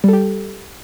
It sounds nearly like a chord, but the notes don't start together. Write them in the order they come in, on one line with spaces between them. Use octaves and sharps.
G3 A4 G4